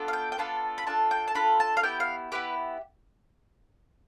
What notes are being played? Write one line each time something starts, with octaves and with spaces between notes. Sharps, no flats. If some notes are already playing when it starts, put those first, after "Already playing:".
Already playing: B3 D4 F4 A4
F5
G5
G5
B3 D4 F4 A4 A5
B5
D4 F4 A4 A5
G5
A5
D4 F4 A4 B5
A5
F5
B3 E4 G4 G5
F5
B3 E4 G4 B4